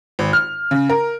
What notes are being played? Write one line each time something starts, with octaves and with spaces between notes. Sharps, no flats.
G#1
F6
C#3
A#4